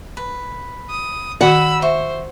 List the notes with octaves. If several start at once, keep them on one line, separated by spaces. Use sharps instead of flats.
B4
D#6
D#3 F#4 F#5 B5 E6
C5 E5 C#6